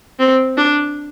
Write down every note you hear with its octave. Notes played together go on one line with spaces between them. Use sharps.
C4
D4